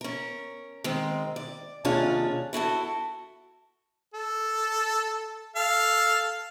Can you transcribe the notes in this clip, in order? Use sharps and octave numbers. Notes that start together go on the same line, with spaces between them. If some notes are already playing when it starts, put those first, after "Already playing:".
C#4 A#4
D#3 G#3 C4
D5
D#2 C3 C#4 D4 F4 G#4
E4 F#4 G#4 A4
A4
A4 F5